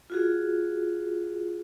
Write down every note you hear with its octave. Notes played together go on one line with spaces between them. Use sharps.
F4 F#4 G#4